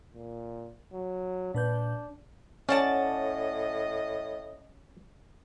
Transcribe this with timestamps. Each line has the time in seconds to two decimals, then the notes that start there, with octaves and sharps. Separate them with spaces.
0.14 A#2
0.93 F#3
1.54 A#2 D4 B4 G6
2.69 A2 C#4 D5 D#5 F#5 A5